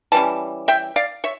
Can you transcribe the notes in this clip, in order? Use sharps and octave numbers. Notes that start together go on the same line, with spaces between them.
E3 G3 C#4 A5
E5 G5
D5 F5
C#5 E5